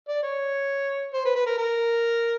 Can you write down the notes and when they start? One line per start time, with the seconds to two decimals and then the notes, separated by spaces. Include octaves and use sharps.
0.08 D5
0.23 C#5
1.14 C5
1.25 B4
1.35 B4
1.47 A#4
1.58 A#4